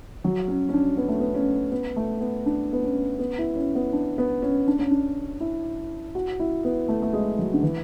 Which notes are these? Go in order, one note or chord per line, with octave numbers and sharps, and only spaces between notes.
F#3
C#4
C#4
D4
B3
A3
B3
C#4
B3
A3
B3
D4
B3
C#4
B3
E4
C#4
B3
D4
B3
C#4
D4
C#4
D4
E4
F#4
E4
B3
A3
A3
G#3
F#3
D3
E3